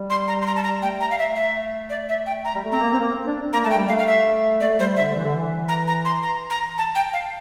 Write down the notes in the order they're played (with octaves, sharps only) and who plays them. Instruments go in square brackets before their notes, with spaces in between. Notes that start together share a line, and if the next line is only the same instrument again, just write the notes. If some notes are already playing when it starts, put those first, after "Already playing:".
Already playing: [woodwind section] G3
[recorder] C6
A#5
C6
A#5
A5
A#5
[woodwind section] A3 [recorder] G5
[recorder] A#5
F5
E5
E5
D5
E5
G5
A#5
[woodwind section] G3
A3
[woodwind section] C4 [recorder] A#5
[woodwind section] A#3
C4
A#3
C4
D4
[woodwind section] A#3 [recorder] A#5
[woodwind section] A3 [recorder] A5
[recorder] G5
[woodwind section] G3
[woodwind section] A3 [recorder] F5
[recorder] F5
E5
[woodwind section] A3 [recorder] D5
[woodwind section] G3 [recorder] C5
[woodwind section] D3 [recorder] E5
[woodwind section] E3
D3
E3
[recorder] A#5
A#5
C6
A#5
A#5
A5
G5
F5